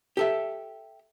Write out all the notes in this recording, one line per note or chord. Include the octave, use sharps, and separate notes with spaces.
G4 A4 E5